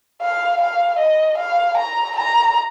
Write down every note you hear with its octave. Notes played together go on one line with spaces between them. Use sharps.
F5
F5
D#5
F5
A#5
A#5